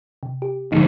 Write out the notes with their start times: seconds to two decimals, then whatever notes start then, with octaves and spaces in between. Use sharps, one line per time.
0.23 C3
0.42 G4
0.72 A#1 G#2 D3 D#4